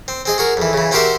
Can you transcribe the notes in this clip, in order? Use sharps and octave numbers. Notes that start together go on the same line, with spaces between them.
C4
C4 G#4 D#5
F#4 G#4 A#4
F2 E3
C#3 E3
C4 F#4 G4 A#4 C5 E5